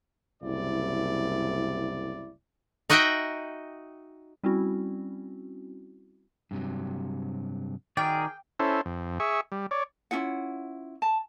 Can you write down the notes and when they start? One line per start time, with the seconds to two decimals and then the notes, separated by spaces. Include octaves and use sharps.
0.41 F#1 C2 E4 D5
2.90 D#4 F#4 D#5 E5 F#5 G5
4.44 G3 C4 C#4 E4 F#4
6.51 G2 C3 F#3
7.97 D#3 D#4 F#4 G#4 A#4 D5 G5
8.59 C#4 E4 A4 C5
8.86 F2
9.20 G#4 E5 C#6
9.52 G3
9.71 C#5 D5
10.11 C#4 E4 F4 F#5
11.02 A5